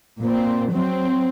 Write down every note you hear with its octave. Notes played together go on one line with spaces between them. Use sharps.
A#2 C4
F#3 C4